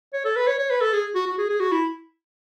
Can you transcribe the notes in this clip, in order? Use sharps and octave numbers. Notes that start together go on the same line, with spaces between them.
C#5
A4
B4
C#5
C#5
B4
A4
G#4
F#4
F#4
G#4
G#4
F#4
E4